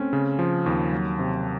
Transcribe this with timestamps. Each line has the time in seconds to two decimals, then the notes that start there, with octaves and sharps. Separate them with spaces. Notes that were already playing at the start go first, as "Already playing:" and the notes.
Already playing: A3 C4 C#4
0.13 C#3
0.39 F3
0.66 D#2
0.93 F#3
1.19 C3